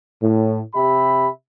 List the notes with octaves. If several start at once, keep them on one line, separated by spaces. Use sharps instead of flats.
A2
C3 G4 E5 B5